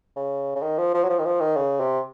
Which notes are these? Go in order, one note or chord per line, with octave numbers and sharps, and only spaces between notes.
C#3
C#3
D#3
F3
F3
F#3
F3
D#3
F3
D#3
C#3
C3